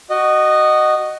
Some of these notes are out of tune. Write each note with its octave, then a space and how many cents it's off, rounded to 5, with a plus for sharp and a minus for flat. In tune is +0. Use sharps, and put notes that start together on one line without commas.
F#4 +15 D#5 -15